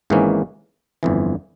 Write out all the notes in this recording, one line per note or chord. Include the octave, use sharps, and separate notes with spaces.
G#1 G#2 E3 A#3 C#4
G1 F2 E3